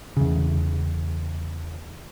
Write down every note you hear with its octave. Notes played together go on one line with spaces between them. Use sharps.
E2 C#3